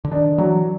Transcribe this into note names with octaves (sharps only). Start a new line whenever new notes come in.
D3
D#3 D4
E3 F#3